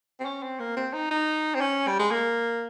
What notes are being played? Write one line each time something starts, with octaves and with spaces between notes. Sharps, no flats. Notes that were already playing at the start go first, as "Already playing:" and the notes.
C4
C#4
C4
A#3
C4
D#4
D#4
C4
C#4
G3
G#3
A#3